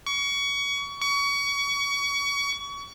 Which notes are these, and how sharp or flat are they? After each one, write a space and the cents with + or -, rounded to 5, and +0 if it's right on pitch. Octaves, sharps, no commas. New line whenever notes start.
C#6 +25
C#6 +30